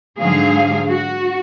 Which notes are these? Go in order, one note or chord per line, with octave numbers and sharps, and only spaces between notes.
G#2 D3 F#3 G#4 F5
F#4